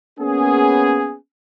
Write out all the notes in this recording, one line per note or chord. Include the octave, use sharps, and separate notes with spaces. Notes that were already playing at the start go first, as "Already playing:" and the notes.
A#3 B3 C#4 G#4